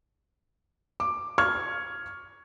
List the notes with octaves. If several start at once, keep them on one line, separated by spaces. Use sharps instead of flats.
D6
C#6 F6 G#6